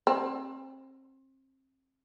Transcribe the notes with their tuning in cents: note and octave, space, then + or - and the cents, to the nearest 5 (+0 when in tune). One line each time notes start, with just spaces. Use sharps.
C4 +30